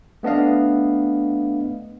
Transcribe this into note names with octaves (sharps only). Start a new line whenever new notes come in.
A3 B3 D4 D#5 F5